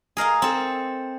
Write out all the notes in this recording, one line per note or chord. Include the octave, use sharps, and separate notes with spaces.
G#4 A#4 D#5 F5
C4 A4